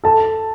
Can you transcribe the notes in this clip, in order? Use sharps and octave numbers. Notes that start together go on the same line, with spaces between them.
A4 A5